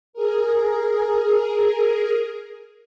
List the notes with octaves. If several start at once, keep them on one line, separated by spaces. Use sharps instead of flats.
G#4 A#4